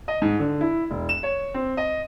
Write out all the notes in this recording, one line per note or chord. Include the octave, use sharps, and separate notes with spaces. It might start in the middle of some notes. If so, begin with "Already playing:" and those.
D#5
G#2
D3
E4
E1
E7
C#5
C4
D#5